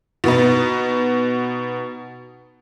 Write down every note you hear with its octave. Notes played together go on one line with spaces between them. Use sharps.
B2 B3 D#4